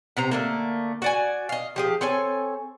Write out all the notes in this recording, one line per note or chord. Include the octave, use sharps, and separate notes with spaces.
C3 C4 A#5
D3 A3 A#3
F#4 D5 G#5
D#5 F5
F3 G4 G#4
C4 A4 C#5 G#5